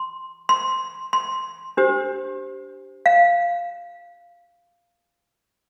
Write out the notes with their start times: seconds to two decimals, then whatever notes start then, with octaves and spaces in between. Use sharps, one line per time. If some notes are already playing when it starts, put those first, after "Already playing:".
Already playing: C6
0.49 C6
1.13 C6
1.77 D4 G4 C5
3.06 F5